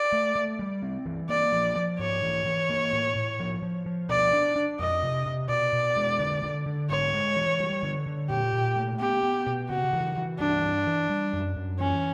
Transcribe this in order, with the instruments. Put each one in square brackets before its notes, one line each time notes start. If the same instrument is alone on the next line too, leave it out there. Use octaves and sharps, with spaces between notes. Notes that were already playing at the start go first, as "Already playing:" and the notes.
Already playing: [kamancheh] D5
[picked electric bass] A3
A3
G3
C4
E3
[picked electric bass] A#3 [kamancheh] D5
[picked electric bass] F3
F3
[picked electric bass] G#2 [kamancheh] C#5
[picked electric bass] E3
E3
A#3
A2
A2
F3
F3
F3
[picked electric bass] B2 [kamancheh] D5
[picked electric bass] D4
D4
[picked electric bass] F2 [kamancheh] D#5
[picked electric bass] C3
C3
[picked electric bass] B2 [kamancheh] D5
[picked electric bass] B2
G#3
D3
D3
D3
[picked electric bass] G#2 [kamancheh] C#5
[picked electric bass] G#3
E3
G3
D3
D3
[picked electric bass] A#2 [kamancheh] G4
[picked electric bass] A#2
A3
[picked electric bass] B3 [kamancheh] G4
[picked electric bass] B3
B2
[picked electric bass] C#3 [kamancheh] F#4
[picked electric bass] E3
E3
[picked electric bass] G2 [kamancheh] D4
[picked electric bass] G2
E3
G3
F#2
F#2
[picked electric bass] E3 [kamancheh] C#4